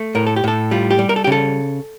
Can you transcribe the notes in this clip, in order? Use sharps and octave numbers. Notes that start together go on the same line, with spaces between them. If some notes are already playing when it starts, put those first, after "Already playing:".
Already playing: A3
A2 A#4
A4
G4
A2 A4
G3 F4
G4
G3
A#4
A4
G4
C#3 A4